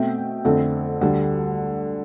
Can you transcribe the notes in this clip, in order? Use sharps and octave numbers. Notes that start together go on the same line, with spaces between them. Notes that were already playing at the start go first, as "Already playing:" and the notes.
Already playing: B2 A3 C4 E5 G5
F2 D3 A3 C4
D2 D3 G3